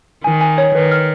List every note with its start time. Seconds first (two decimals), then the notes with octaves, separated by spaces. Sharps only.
0.24 D#3 G#5
0.41 G#5
0.58 C#5
0.75 D#3 B4
0.91 F6